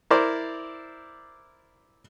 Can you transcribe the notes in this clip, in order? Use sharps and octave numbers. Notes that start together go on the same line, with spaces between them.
E4 A#4 C5 D5